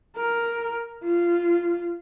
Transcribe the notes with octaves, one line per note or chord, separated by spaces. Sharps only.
A#4
F4